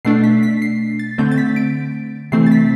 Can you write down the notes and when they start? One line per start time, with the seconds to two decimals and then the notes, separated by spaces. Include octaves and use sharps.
0.05 B2 A3 D4 C7
0.24 B6
0.43 B6
0.62 C7
0.99 A6
1.18 D3 A3 C4 G6
1.32 A6
1.38 B6
1.56 D7
2.32 C3 E3 A3 C4 C7
2.46 A6
2.51 B6